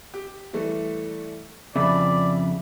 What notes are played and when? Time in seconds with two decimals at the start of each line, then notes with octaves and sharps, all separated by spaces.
0.14 G4
0.53 E3 G3 A3
1.76 F2 C#3 D5 E5 B5